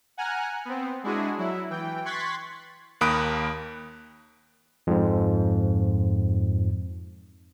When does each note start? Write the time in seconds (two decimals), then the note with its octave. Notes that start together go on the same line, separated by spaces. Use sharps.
0.17 F#5 G#5 A#5 F6 F#6
0.65 B3 C4
1.03 G#3 D4 E4 F#4 G#4
1.38 F#3 E4
1.70 E3 G5
2.05 C6 C#6 F#6 G#6 A6 B6
3.01 D#2 A#3 B5 D#6 F#6 D7
4.87 F2 G#2